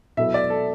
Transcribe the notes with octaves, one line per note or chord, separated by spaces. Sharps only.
B2 F#3 B3 E4 A4 E5
D5
A4